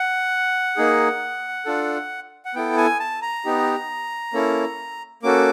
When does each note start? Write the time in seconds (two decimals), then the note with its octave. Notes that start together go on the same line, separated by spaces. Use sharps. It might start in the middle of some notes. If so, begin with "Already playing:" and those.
Already playing: F#5
0.77 A#3 D#4 G#4
1.66 D4 F4 A4
2.45 F#5
2.55 B3 E4 A4 G5
2.77 G#5
3.00 A5
3.22 A#5
3.45 B3 D#4 G4
4.34 A#3 C#4 E4 A4
5.23 A#3 C#4 F#4 A4 D6